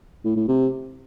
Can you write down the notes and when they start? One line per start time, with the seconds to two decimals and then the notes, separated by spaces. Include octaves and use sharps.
0.25 A2
0.36 A2
0.48 C3